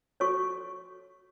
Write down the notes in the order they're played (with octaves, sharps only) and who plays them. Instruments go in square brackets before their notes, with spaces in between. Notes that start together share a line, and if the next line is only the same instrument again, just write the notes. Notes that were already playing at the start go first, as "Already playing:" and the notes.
[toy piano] F#4 A4 C#5 C#6